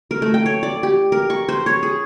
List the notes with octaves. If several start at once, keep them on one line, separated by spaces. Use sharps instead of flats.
A#4
A3
G5
C#5
D5
G4
A#4
C#6
C5
C#5
G#4